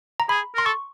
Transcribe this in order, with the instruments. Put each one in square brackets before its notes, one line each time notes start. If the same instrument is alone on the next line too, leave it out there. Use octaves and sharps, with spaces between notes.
[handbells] A#5
[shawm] G#4 [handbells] B5
[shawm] A#4 [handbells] C6
[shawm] A4 [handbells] C#6